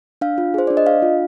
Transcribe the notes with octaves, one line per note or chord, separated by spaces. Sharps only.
D4 F5
F4
G#4 C5
D4 D5
D#5
D4 F5
F4